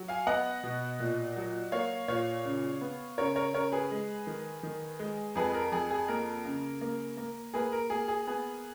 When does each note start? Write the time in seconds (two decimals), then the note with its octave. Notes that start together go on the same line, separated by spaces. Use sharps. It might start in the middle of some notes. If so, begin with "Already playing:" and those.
Already playing: F#3
0.08 F5 G#5
0.27 B3 D#5 F#5
0.63 B2
1.00 A#2
1.37 F#3
1.72 A#3 C#5 F5
2.08 A#2 C#5 F5
2.45 C#3
2.81 B3
3.18 C#3 A#4 C#5
3.36 A#4 C#5
3.54 C#3 A#4 C#5
3.72 G#4 B4
3.91 G#3
4.27 D#3
4.63 D#3
4.99 G#3
5.35 F2 G#4 B4
5.54 A#4
5.72 F2 G#4
5.91 G#4
6.08 A#3 A#4
6.45 C#3
6.81 A#3
7.17 A#3
7.54 A#3 G#4 B4
7.72 A#4
7.90 A#3 G#4
8.08 G#4
8.27 B3 G#4